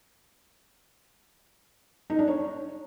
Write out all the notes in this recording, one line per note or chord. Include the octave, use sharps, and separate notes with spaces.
D#4
D4
C#5